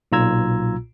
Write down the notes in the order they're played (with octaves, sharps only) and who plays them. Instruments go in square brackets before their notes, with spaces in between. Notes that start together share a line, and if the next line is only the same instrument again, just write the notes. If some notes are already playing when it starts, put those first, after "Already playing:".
[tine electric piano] B1 A#2 F4 A#5 E6 G#6